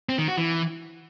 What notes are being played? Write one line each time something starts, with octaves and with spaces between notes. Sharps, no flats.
C4
D#3
F#4
E3